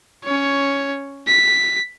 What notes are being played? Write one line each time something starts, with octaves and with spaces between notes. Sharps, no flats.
C#4 C#5
B6